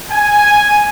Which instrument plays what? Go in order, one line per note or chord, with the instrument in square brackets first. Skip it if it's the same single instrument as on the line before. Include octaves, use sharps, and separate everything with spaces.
[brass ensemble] G#5